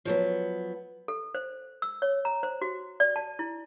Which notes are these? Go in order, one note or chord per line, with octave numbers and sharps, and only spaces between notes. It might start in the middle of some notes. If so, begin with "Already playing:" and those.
F3 F#3 B3
A4
C5
E6
C#5
A#5
C5
F#4
D5
A5
E4